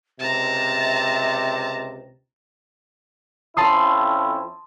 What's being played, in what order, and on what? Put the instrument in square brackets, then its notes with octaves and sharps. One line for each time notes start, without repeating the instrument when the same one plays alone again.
[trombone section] C#2 C3 [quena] E5 [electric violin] A5 A#5
[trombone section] F2 C#4 E4 [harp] A5 C6 D#6